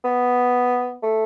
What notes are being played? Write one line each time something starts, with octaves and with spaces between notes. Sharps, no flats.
B3
A3